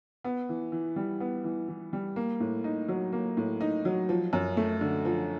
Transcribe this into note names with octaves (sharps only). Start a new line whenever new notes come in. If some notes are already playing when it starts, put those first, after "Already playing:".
B3
E3
E3
G3
B3
E3
E3
G3
A#3
A2
D#4
F#3
A#3
A2
D#4
F#3
F3
F#2
A3
D3
F3